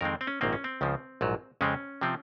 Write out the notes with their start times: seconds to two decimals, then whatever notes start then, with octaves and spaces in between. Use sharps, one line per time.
0.01 F2 D#3 G#3 C4 A#4
0.21 C4
0.27 C#4
0.41 A#1 G#2 D#3 A#3 C4
0.53 C#4
0.64 C4
0.81 C#2 C#3 F3
1.21 A#1 G#2 F#3
1.61 F2 C#3 G#3 C4 C#4
2.01 C3 F3 C4